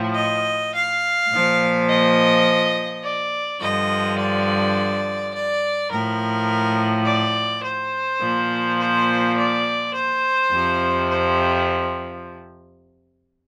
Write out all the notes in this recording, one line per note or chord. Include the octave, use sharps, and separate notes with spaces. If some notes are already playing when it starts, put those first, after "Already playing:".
Already playing: A2 F3
D#5
F5
A#2 F3
D#5
D5
G2 D3 F3 D#5
D5
D5
A2 F3 A#4
D5
C5
A#2 F3
C5
D5
C5
F2 C3 F3
C5